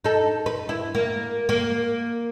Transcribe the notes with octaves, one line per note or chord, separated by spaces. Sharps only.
D#4 A4
B4
E4
A#3
A#3